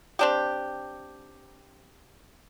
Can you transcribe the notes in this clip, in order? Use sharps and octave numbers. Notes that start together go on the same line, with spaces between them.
C4 D4 G4